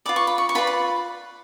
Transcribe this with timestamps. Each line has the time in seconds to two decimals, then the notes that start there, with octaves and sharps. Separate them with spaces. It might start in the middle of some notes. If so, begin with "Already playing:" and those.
0.06 F4 B4 D5 D6
0.16 C#6
0.27 B5
0.38 C#6
0.49 C#6
0.55 F4 B4 D5 B5
0.67 B5